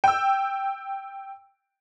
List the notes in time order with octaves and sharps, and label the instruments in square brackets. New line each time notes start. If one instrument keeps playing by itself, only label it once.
[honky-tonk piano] G5 E6